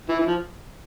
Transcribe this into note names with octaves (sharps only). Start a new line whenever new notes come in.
E3
E3
F3